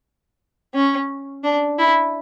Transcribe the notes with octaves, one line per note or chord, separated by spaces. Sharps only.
C#4
D4
E4